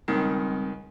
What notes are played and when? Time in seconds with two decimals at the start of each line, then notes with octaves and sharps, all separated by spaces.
0.08 C#2 D#3 G3 C4